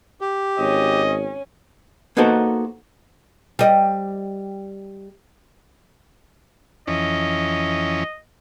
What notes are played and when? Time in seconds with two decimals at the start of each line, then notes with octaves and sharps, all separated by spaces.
0.21 G4
0.59 G#1 C#4 D#5
2.17 A#3 B3 D#4 F#4 A4 C5
3.59 G3 D#5
6.87 F2 E3 C#4 D#5